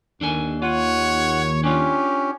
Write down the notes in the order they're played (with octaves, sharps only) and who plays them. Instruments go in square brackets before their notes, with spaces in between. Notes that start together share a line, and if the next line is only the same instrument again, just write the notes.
[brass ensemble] D#2 [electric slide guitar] D4 A4 G#5
[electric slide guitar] F4 [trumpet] C#5 [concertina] F#5
[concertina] C#4 [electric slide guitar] D4 F4 [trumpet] G4